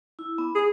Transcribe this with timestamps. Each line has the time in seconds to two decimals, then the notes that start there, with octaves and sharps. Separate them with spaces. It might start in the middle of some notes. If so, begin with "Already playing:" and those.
0.19 E4
0.38 B3
0.55 G#4